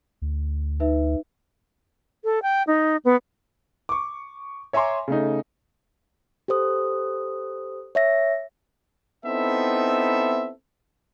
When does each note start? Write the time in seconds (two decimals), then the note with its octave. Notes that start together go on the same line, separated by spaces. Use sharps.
0.22 D2
0.80 D#4 B4 E5
2.24 A4
2.42 G5
2.67 D#4
3.05 B3
3.89 C#6 D6
4.73 C#5 E5 G#5 A#5 C6 D6
5.08 C#3 A3 D#4
6.48 G4 A4 C5 D#6
7.95 C#5 E5 A#6
9.25 B3 C4 D#4 E4 A4 E5